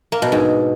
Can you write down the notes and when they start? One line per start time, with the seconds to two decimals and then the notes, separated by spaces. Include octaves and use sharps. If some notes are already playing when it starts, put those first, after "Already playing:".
0.12 A#3
0.22 B2
0.32 G#2